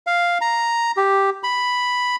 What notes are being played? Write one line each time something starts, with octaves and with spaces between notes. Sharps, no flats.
F5
A#5
G4
B5